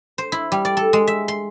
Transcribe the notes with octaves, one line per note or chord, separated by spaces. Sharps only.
C5
E4
G3
D5
A4
G#3
E5
C6